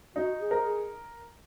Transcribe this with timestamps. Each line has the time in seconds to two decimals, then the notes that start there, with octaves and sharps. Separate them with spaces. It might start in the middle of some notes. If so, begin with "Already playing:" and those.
0.15 D#4 F#4
0.39 G#4
0.51 A#4
0.63 G#4